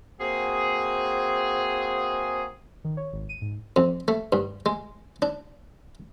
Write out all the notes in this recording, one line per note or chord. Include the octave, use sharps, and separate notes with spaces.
A#3 C4 F#4 G#4
D#3
C#5
G#1
D#7
G#2
F2
A3
G2
G#3
D4